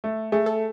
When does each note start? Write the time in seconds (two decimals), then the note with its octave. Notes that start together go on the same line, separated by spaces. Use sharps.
0.04 A3
0.32 A3 G#4
0.46 A4